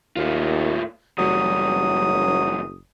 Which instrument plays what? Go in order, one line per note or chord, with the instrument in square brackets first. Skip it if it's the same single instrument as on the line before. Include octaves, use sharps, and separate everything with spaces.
[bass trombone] D#2 [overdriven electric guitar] A2 F4
[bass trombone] F#1 [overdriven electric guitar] E2 G2 [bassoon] F#3 [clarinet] D#6